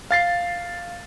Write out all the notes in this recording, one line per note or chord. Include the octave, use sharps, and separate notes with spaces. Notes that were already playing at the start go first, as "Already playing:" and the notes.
F5 A6 C7